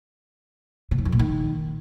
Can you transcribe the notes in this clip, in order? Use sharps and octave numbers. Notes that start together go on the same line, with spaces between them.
C#3
D#3
F2
A#2
D#3